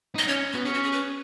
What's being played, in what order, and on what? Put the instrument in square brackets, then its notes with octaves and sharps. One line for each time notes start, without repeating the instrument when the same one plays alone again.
[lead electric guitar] D#4 [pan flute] D#5
[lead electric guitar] C#4 [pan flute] C#5
[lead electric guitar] B3 [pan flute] F#4
[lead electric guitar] C#4 [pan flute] G#4
[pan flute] F#4
G#4
B4